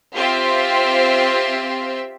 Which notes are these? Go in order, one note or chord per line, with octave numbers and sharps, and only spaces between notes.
C4 F4 G4 C5 E5